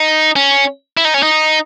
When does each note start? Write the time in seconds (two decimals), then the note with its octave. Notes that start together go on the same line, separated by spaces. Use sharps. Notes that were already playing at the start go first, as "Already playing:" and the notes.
Already playing: D#4
0.36 C#4
0.97 E4
1.05 D#4
1.14 C#4
1.23 D#4